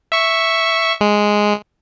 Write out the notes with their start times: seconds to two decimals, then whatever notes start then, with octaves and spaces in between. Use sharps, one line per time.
0.12 E5 C#6
1.01 G#3